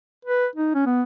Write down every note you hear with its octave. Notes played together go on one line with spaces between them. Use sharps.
B4
D#4
C#4
B3